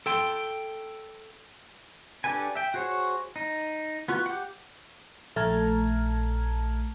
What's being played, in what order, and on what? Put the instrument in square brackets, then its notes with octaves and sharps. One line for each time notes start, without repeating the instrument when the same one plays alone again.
[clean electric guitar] A4 G5 C6
[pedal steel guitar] D4 G4 A4 B4 G#5
E5 G5
F#4 G#4 C5 C#5
D#4
B3 F4 F#4
G4 F#5
[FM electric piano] A#1 A3 A5 A#5 F6 G#6